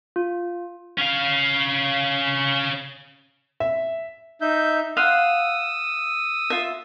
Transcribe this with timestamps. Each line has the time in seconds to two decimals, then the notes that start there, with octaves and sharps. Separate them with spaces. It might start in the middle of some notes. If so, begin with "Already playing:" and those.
0.16 F4
0.98 C#4 F5
3.60 E5
4.41 D#4 E5 G6
4.97 F5 F#5 C6 D#6 E6
6.50 F4 E5